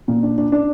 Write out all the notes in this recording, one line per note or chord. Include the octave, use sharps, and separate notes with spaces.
A#2
D4
D4
D4